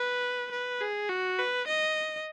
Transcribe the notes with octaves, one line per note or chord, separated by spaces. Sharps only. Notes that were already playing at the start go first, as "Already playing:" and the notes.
Already playing: B4
B4
G#4
F#4
B4
D#5